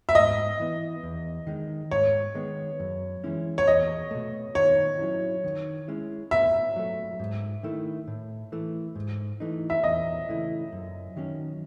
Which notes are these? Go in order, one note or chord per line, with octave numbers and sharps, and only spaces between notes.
E5
G#2 D#5
E3 B3
E2
D#3 G#3 D#4
G#2 C#5
D#3 G#3 B3 D#4
F#2
E3 G#3 C#4 E4
C#5
E2 D#5
B2 A3
D#3 C#5
F#3 C#4 E4
D#3
G#3 C#4 E4
B2 E5
F#3 A3
G#2
D#3 A3 E4
A2
E3 A3
G#2
E3 A3 D#4
E5
E2 D#5
C#3 E3 A3 E4
F#2
D#3 F#3 C#4